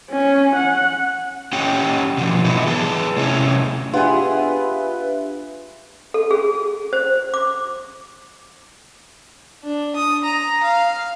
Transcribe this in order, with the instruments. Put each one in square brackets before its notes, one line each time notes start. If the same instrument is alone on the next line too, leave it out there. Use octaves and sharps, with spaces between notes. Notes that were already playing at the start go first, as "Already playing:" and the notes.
[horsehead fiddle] C#4
F#5
[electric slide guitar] C#4 G4 F#5 G5
B2 E3 F3
E3 B3 D#4 E4
G#4 B4 A5
A2 C3 C#4 E4
[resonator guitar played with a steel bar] B3 G#4 [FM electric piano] D4 G4 E5 [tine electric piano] F4 [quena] B4
[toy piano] A4
G#4
C5
D6
[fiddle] D4
D#6
A#5
F5